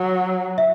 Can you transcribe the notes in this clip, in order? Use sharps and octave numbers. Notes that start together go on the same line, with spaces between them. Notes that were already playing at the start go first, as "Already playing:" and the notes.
Already playing: F#3
E5